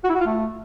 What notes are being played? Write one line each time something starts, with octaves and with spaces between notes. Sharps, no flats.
F#4
E4
F#4
F4
A3